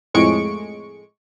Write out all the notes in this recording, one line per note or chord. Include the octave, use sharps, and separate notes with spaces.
F2 A2 G#3 C#6 C#7 D7